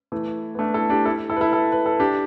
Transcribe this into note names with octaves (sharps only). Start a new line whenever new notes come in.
E3 A3
B3
A3 D4
E4 A4
D4 G4
E4 A4
E4 A4
B4
E4 A4
E4 A4
B4
A4
D4 G4